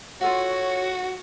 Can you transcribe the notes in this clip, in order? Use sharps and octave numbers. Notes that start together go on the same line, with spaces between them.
F4 F#4 A4 C#5 F#5